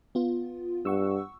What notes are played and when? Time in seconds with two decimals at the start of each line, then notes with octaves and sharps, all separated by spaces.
0.15 B3 F4
0.85 G2 F#5 C#6 E6